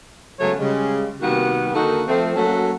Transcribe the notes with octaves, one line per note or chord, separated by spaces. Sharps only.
C#3 F#3 G#3 A3 B3 C#5
C#3 G3 G#3
C3 D#3 G3 A#3 B3 F#4
D3 D#3 A#3 D#4 F#4 A4
F3 A3 C4
F#3 A3 A#3 C#4 F#4 A4